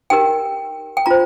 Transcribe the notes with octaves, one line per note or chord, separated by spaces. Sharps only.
D#4 G4 A#4 G5
G5
F4 C5 A#5